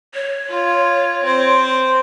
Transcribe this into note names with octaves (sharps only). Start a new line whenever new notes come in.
C#5
F4
C4 C5